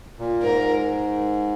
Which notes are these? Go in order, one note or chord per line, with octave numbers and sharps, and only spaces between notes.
A#2
G#2 A#4